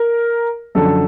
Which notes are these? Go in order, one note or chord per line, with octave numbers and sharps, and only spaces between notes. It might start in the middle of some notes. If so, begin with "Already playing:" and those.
Already playing: A#4
F#2 D3 F3 A4